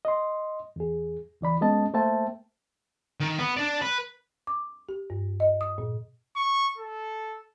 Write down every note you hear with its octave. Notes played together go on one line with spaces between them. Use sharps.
D#5 C6
E2 G#4
C#2 E3 D5 B5
G#3 B3 C#4 D#5 A5
A3 A#3 C5 E5 G5 A5
D#3
B3
D4 D5
B4
D6
G4
G2
D#5
D#6
A#2
C#6
A4